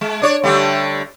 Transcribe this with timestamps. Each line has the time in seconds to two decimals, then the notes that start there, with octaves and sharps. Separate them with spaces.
0.01 G#3
0.22 D4 C#5 D5
0.43 D3 G3 A3